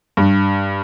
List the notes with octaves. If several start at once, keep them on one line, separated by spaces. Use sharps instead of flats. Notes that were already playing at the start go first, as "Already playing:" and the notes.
G2